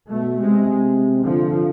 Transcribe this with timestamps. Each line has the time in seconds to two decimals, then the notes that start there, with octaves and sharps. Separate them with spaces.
0.11 B2 A3
0.40 C3 G#3
1.25 D3 F3